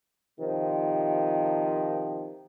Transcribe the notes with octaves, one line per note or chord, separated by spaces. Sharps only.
C3 D#3 F3